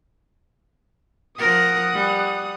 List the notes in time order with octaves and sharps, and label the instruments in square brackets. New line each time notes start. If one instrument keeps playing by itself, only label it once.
[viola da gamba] F3 A#4 [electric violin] F#5 D#6
[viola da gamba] G3